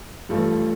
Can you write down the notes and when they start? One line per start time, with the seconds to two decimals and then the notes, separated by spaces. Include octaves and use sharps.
0.29 A1 G2 F3 A3